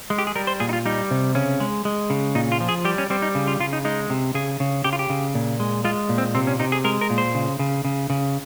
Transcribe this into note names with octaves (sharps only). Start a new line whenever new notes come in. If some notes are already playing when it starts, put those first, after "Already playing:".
G#3
G4
G#4
G3 A#4
C5
A#2 G#4
D#4
F4
G3 D#4
C3
C#3 C#4
G#3
G#3
C#3
A#2 D#4
F4
F3
G#4
G3 G4
C#4
G3 C4
D#4
C#3
F4
C#3 F4
D#4
G#3 D#4
C3
C#3 G#4
C#3
C#3 G4
F4
G4
C#3
A#2
G#3
G#3 F4
A#2
C4
C3 C4
C#4
C3 D#4
G#4
G#3 A#4
A#4
A#2
C5
C#3
C#3
C#3
C#3